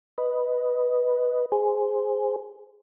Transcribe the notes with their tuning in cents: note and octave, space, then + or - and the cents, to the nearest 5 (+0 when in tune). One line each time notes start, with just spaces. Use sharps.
B4 +0 D#5 +0
G#4 +0 C5 -5